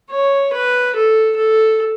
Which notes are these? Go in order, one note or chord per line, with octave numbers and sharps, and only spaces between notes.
C#5
B4
A4
A4